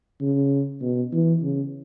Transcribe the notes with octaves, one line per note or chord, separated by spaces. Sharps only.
C#3
B2
E3
C#3